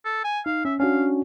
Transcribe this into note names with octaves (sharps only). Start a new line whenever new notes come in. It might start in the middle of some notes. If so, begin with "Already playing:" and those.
A4
G#5
D#4 F5
C#4 E5
C#4 D4 F#4 F5